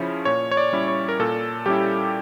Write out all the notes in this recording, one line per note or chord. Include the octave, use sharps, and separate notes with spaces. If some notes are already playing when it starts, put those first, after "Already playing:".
Already playing: C#3 F3 C#4 E4
A#2 C#5
C#5
D5
G3 C#4 E4
C#5
A#4
A#2 A4
G3 C#4 E4 G4